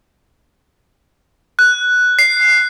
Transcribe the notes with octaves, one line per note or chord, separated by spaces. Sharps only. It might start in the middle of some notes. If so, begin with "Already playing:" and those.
F#6
C7